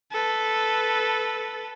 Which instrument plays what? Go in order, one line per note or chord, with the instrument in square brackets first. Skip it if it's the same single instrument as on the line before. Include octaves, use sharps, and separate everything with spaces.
[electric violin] A4 B4